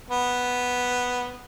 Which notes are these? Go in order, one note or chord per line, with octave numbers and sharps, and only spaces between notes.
B3